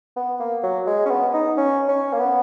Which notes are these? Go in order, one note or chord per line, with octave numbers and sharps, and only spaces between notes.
B3
A#3
F#3
G#3
C#4
B3
D#4
C#4
C#4
A#3
B3